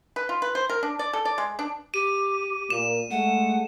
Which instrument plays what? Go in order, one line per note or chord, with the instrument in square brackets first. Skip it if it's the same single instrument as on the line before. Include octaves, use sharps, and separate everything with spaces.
[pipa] B4
F4
B4
C5
A#4
D4
D5
A4
D5
G#3
D4
[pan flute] G4 [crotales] D#7
[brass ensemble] A#2 A#3 [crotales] E7
[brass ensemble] G#3 A3 [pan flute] F#5